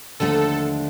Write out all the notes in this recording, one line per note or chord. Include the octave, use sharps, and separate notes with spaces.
D#2 D3 F3 A3 D4 A4